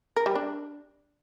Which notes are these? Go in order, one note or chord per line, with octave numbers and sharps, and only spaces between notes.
A#4
G3
D4